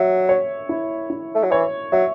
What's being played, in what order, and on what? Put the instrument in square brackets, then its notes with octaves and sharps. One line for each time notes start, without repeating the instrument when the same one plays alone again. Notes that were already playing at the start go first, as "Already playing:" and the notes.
Already playing: [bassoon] F#3 [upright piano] E5
[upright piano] C#5
E4
E4
[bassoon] A3
F#3
[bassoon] E3 [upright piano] C#5
[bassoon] F#3 [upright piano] E5